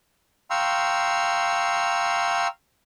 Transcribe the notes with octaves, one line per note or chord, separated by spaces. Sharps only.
F5 G5 A#5 C6 C#6 E6